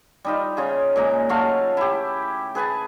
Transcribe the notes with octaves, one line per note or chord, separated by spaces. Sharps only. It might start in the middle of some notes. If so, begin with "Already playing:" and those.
G3 D#4 F4
C#3 F4 G#4
A#2 G#3 A#5
F#3 A3 F4 F5
E4 G4
G#4 B4 G#5 A5